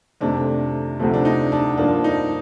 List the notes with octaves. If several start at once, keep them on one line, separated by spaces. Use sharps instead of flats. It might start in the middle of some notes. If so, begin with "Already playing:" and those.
F2 C3 D#3 A3 D4
D2 C3 F3 A3
D4
D#4
D4
G2 F3 A#3 D4
D#4